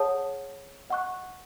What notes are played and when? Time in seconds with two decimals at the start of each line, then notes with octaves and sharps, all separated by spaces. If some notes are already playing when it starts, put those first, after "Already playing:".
Already playing: G#4 C#5 F#5 A5 D#6
0.90 D#5 F#5 C#6 F#6